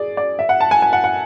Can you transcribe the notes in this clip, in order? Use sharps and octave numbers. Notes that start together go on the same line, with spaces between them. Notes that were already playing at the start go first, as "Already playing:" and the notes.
Already playing: G#4 D5
D5
E5
F#5
A5
G#5
G#5
F#5
F#5